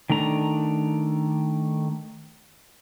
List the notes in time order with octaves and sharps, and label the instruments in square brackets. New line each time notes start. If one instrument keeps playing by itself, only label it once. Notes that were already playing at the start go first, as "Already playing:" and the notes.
[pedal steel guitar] D#3 A3 D4 A#5